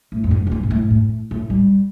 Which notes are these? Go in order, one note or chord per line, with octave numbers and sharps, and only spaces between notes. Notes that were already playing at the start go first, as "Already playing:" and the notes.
A2
F2
G2
A2
G2
A#2
A2
A2
A2
G3